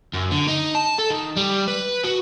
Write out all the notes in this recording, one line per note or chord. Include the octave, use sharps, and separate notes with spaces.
F#2
D3
D#4
A5
A4
D#3
G3
B4
F#4